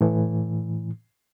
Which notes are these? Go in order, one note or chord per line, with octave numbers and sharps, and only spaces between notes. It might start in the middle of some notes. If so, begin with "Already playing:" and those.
A2 E3